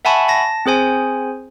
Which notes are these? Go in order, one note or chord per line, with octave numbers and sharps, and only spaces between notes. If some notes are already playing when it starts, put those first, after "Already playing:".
E5 F#5 G#5 A5 B5 C#6
A5 A#6
C4 G#4 C5 G#5